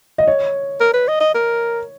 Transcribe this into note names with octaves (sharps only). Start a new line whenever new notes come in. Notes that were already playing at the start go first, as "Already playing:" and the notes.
D#5
C#5
A#4
B4
D#5
D#5
A#4